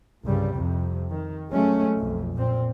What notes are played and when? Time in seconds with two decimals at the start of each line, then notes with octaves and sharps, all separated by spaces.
0.24 C2 G2 C#3 G3
0.53 F2 C3
1.11 D#3
1.50 F#3 G#3 A3 C#4
1.98 B1 F2
2.33 A#2 C4